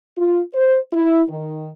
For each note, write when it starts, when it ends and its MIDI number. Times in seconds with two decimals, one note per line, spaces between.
0.17 0.40 65
0.54 0.77 72
0.93 1.22 64
1.29 1.70 51